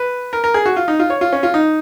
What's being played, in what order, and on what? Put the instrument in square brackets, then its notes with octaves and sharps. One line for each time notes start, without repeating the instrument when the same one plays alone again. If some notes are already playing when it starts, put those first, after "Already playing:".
Already playing: [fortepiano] B4
A#4
A#4
G#4
F#4
F4
D#4
F4
C#5
F4
C#4
F4
D#4